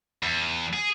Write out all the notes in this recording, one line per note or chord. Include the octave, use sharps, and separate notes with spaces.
E2
G#4